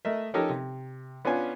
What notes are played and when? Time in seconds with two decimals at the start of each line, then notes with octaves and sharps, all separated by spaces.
0.05 A3 A#4 D#5 E5
0.34 F3 C#4 D#4 G4 A4 A#4
0.49 C3
1.25 B3 C#4 D4 F4 G#5